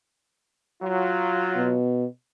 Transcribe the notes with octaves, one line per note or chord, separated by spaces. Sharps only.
F#3 F4
B2